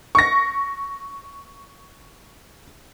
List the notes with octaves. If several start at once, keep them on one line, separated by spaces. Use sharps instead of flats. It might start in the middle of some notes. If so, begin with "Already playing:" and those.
C#6 A#6